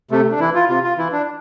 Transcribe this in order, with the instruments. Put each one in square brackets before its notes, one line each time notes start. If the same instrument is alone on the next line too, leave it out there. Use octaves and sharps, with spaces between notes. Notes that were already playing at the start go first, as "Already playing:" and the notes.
[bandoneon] C3 A3
D4
E3 E4
F4
C3 F4
F4
E3 E4
D4